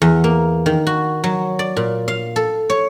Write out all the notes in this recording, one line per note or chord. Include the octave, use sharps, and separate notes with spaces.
E2
A#3
D#3
F#4
F#3
D5
A#2
F5
A4
C#5